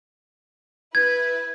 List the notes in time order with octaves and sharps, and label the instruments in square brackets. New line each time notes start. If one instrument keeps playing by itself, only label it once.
[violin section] E4 B4 [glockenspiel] G#6